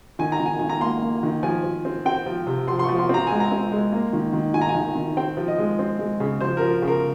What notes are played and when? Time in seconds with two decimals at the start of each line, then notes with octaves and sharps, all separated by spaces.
0.19 D#3 G#5
0.32 A#5
0.40 D#3
0.46 G#5
0.59 D#3 G#5
0.69 A#5
0.81 A#3 C6
1.02 A#3
1.23 D#3
1.43 F3 G#5
1.64 F3
1.85 C4
2.06 C4 G5
2.26 F3
2.47 C3
2.67 F3 C6
2.79 C6
2.84 F3 C#6
2.99 C6
3.09 C4 A#5
3.27 G#3 G#5
3.40 A#5
3.51 C4
3.72 G#3
3.92 A#3
4.13 D#3
4.33 D#3
4.54 D#3 G#5
4.61 A#5
4.69 G#5
4.75 D#3
4.96 D#3
5.17 C4 G5
5.37 F3
5.48 D#5
5.58 G#3
5.79 C4
5.99 G#3
6.20 C#3
6.40 F3 C5
6.57 F3 A#4
6.82 C#3
6.88 A#4